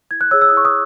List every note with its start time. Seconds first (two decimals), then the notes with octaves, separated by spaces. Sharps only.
0.11 E4 G#6
0.21 F#6
0.31 G#4 C#5 E6
0.42 E6
0.49 D#6
0.52 E4
0.57 C#6
0.65 D#6